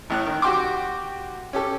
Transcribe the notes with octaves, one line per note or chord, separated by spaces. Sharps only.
A1 A2 F#6
D#3
F#4 G4 G5 C6 D6
C#4 G4 A4